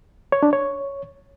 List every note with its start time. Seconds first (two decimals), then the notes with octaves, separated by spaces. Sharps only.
0.32 C#5
0.43 D4
0.53 C#5